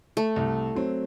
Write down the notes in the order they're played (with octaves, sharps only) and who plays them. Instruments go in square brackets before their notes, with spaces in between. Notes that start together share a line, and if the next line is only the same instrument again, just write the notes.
[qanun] A3
[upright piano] C2
F#3 C4